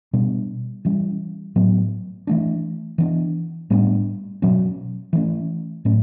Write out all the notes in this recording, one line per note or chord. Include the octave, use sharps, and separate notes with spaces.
B2 G3 B3 D4
E3 G3 C#4
A2 F#3 B3
E3 A3 D4
E3 B3 D4
A2 G3 B3 D4
B2 F#3 C#4
E3 A3 C#4
A2 F#3 A3 C#4